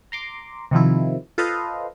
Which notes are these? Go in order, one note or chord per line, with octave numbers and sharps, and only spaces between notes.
A#5 C6 D6
C3 D#3 F3 E4
F4 A4 B4 C5 D#5 F5